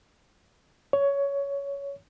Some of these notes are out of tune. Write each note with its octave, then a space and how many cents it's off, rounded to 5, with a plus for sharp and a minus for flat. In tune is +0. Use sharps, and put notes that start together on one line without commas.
C#5 +15